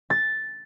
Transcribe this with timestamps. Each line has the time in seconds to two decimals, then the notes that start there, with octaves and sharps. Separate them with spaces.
0.10 A6